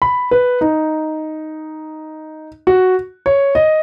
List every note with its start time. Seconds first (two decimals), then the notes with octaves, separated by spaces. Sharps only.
0.02 B5
0.31 B4
0.61 D#4
2.67 F#4
3.26 C#5
3.55 D#5